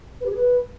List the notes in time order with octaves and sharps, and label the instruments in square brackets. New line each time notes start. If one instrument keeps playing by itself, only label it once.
[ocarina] B4
G4
G#4
B4